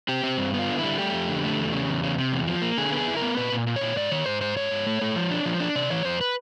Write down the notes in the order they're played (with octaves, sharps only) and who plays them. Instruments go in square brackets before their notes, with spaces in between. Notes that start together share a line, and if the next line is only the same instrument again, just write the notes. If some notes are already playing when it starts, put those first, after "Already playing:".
[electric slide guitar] C4 G4
C4
G2
B3
F4
D3
G3 E4
A3 G4
F2
D3
A3
E2
C#3
E2
C#3
C3
E2
F3
A#3
D3 G#4
B3
G#4
E4
A#4
B3
A#2 B4
A#2
A#2
C#5
A#2
G#2 D5
D#3 C#5
G#2 C5
G#2 C5
G#2 C#5
G#2
A3
A3
F3
D4
F3
D4
C3 D5
E3 C#5
F2 C5
B4